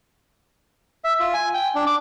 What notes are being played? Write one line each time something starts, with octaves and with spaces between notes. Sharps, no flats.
E5
F4
G#5
G5
D4
D6